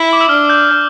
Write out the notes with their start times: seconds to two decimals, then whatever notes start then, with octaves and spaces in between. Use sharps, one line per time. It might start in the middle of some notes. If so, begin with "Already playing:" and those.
Already playing: E4
0.13 D6
0.21 E6
0.29 D4 F6
0.50 G6
0.69 G6